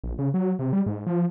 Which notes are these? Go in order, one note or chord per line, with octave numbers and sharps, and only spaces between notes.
A#1
C#3
F#3
C3
G3
G#2
F3